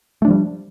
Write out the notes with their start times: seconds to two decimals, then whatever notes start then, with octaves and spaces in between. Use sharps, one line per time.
0.22 A3
0.25 D4
0.28 F3
0.31 G3